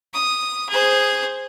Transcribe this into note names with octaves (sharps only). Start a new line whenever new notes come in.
D#6
G#4 C5